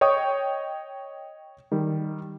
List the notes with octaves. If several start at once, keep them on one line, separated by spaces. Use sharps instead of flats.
C#5 D#5 G5 C#6 D#6
D#3 G3